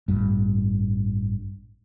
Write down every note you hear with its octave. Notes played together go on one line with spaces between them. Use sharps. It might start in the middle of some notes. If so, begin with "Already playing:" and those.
A1 G2